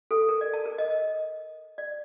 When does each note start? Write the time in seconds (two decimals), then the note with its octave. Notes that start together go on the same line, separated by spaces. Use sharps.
0.11 A4
0.29 A#4
0.41 D5
0.54 A5
0.66 A#4
0.78 D#5
0.90 D#5
1.78 D5